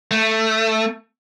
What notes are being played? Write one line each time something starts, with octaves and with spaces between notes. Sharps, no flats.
A3